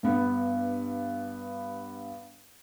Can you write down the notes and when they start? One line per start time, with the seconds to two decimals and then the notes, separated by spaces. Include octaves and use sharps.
0.03 G2 B3